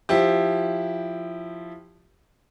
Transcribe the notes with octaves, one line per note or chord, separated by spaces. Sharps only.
F3 E4 G4